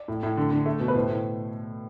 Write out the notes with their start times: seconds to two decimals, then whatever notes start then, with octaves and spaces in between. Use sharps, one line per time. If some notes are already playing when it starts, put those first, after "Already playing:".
Already playing: D5
0.08 A2
0.23 A2
0.37 D3
0.51 D3
0.66 A3
0.80 B2
0.88 B4
0.95 A2 C5
1.09 A2